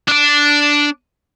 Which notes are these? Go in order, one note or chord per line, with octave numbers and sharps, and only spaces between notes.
D4 D5